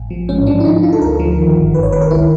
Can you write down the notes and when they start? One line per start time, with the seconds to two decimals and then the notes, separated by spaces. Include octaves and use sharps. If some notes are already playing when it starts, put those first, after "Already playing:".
Already playing: A1
0.10 F3
0.28 G#2 C#4
0.47 F3 D4
0.60 E4
0.65 D3 D#4
0.83 D3 F4
0.93 A4
1.01 D2 A#4
1.20 F3
1.38 D#3
1.56 G1
1.74 G1 B4
1.83 C#5
1.92 D#3 B4
2.02 A#4
2.11 C#2 E4